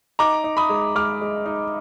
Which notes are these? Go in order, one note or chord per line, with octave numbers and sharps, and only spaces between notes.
D#4 A#5 D6
D#4
B5 D#6
G#3
G#3 D6 F6
G#3
D#4